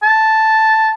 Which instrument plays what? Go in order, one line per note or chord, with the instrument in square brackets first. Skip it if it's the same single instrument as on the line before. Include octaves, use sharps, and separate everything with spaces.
[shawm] A5